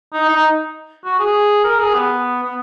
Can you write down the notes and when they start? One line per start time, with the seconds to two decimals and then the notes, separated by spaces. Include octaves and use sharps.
0.14 D#4
0.29 D#4
1.05 F#4
1.19 G#4
1.64 A#4
1.79 G#4
1.95 B3
2.43 B3